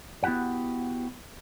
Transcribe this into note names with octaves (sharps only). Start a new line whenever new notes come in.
B3 E4 F#4 G4 F#5